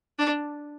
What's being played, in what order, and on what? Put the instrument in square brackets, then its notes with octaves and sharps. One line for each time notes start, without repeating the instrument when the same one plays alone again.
[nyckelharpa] D4